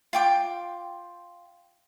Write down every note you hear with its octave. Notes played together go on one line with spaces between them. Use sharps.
F4 G5 D6